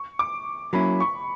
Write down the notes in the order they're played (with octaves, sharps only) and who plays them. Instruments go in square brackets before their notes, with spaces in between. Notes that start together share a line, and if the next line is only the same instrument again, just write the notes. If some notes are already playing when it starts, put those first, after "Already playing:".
Already playing: [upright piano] C#6
D6
[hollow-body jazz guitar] F#3 A#3 C#4 E4 [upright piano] B5
[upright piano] C#6